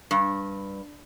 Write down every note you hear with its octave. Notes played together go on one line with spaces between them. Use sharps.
G2